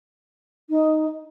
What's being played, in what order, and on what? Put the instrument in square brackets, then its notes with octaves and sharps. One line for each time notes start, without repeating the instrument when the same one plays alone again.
[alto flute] D#4